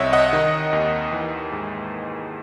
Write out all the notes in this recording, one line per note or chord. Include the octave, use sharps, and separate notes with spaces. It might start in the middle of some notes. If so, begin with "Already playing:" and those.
Already playing: C2 C3 C#5 D#5 E5 F#5
D#5 F#5
D#3
D#2
E3
G#2